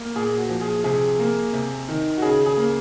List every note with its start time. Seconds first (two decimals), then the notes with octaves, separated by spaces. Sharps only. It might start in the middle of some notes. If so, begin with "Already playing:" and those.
Already playing: A#3
0.15 A#2 G#4
0.38 F#4
0.49 F3
0.61 G#4
0.84 C3 G#4
1.19 A#3
1.53 C3
1.89 D#3
2.18 F#4
2.22 C#3 G#4
2.46 G#4
2.57 A#3